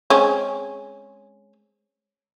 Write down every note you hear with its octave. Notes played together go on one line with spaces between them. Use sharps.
G#3 C4 C#4